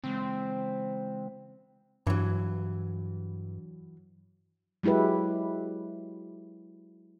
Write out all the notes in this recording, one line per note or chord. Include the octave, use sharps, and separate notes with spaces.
C#3 E3 G#3 C4
G2 E3 F#3
F#3 G#3 E4 G4 B4